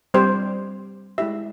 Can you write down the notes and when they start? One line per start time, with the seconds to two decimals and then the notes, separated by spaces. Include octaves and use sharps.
0.14 G3 C4 G4 C5
1.18 G#3 E4 G4 E5